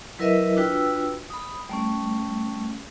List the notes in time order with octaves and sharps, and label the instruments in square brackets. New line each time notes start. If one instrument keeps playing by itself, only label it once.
[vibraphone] F#3 E4 A#4 B4 D#5 E5
D4 F4 F#4 B4 G5 E6
B5 D#6
G3 A3 C#4